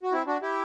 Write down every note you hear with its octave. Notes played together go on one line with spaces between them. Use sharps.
F#4
C4 E4
D4 F#4
E4 G4